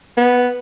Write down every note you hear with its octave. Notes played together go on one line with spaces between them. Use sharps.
B3